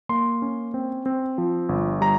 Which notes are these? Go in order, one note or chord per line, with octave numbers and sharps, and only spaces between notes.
A#3 C6
C#4
C4
C4
F3
G1
G3 A#5